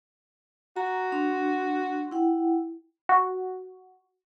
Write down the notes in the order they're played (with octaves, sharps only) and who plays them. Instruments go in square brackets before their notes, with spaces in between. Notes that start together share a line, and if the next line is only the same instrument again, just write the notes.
[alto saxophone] F#4 [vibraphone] A#5
[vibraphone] D4 C6
E4 F#5 G5
[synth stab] F#4